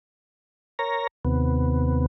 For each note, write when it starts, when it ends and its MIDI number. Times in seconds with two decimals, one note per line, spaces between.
0.79 1.07 70
0.79 1.07 73
0.79 1.07 82
1.25 2.06 39
1.25 2.06 48
1.25 2.06 59